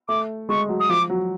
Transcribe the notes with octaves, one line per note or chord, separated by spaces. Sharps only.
A3 D6
G#3 C#6
F#3
D#6
F3 D6
F#3